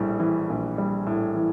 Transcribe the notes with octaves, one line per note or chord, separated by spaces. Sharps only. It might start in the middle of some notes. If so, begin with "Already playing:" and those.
Already playing: A#1 A2 G3
E3
A#1
G3
A2
E3